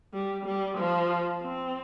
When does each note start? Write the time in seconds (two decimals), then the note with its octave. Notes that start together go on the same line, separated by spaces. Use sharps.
0.14 G3
0.45 G3
0.78 F3
1.42 C4